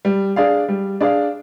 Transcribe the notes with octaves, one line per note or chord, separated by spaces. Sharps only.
G3
D4 G#4 D5 F5
G3
D4 G#4 D5 F5